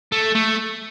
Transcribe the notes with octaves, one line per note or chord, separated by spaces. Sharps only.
A3
A3